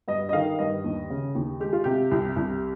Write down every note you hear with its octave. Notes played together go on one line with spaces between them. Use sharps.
G2 D#5
D#5
D#3 F5
G2 D#5
D#2
C#3
D#2
G#3 G4
F4
C3 G4
C2
C2